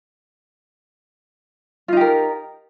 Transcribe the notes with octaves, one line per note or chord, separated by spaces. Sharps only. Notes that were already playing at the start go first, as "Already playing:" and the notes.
D#4 F4 G4 A#4